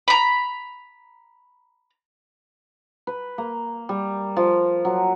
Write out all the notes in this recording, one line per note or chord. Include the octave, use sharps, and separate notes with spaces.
A#5 B5
B4
A#3
G3
F3
F#3